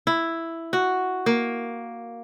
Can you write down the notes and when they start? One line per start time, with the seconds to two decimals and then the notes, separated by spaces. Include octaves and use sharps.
0.07 E4
0.73 F#4
1.26 A#3